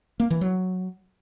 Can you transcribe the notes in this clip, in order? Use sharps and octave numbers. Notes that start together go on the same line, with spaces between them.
A#3
E3
F#3